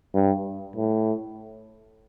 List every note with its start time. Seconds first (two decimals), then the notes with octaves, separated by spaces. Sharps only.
0.14 G2
0.76 A2